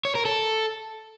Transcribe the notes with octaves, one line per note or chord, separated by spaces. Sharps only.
C#5
A#4
A4